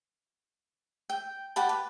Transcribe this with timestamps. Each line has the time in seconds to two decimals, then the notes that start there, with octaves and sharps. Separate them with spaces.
1.10 G5
1.56 G4 F#5 A5 B5
1.69 B4